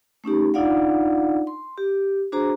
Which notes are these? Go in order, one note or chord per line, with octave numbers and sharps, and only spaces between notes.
A3 C#4 D#4 G4
D4 D#4 F4 D5 F5 F#5
C6
G4
D4 F#4 G#4 C5 A#5